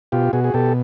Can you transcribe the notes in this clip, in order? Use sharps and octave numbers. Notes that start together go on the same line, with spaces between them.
B2 F4 G4
B2 F#4 G#4
G#4
B2 G4 A4